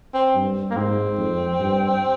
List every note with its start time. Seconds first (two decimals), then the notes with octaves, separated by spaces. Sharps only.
0.14 C4
0.35 G2
0.70 A#3
0.76 G#2 C4
1.18 F2
1.60 G2